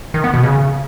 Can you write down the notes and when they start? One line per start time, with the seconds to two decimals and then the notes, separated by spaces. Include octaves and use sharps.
0.14 D#3
0.24 B3
0.34 B2
0.43 C#3